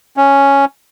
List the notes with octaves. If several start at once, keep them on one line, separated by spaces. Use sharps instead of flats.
C#4